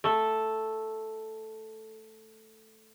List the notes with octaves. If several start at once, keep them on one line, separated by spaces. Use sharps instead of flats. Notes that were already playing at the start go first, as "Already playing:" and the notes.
A3 A4